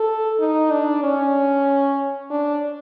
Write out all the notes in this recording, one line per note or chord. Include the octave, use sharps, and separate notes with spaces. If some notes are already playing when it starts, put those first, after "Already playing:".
Already playing: A4
D#4
D4
C#4
D4